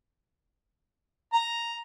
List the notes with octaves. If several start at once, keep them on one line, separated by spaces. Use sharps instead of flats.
A#5